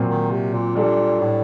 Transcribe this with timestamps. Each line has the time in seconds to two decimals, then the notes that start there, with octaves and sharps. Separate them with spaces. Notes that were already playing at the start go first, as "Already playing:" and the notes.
Already playing: A#2 F#3 C4
0.09 D#3
0.32 C3
0.53 A#2
0.75 A#2 G3 D4 A4
1.20 A2